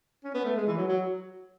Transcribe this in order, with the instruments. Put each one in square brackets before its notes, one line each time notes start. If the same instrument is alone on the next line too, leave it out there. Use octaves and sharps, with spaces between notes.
[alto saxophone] C#4
B3
A3
G#3
E3
F#3
F#3